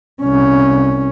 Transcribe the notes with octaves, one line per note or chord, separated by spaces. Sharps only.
C2 C#4